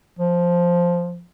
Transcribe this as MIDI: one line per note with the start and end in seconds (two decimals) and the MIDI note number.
0.19 1.23 53